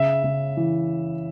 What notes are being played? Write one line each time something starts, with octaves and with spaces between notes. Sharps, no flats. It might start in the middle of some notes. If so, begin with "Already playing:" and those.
Already playing: C#3 E5
C#3
E3